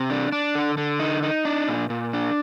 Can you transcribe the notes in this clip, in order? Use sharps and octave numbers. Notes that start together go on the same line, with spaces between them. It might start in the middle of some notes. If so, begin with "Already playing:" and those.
Already playing: C3
D4
D4
D3
D3
D#4
D#4
D4
A#2
A#2
D4